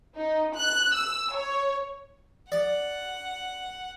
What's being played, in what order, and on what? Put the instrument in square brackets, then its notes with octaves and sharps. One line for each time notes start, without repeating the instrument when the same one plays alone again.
[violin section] D#4
F#6
E6
C#5
[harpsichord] D5 [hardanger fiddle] F#5